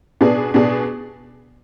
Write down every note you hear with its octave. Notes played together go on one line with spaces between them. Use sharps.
B2 B3 D4 G#4
B2 B3 D4 G#4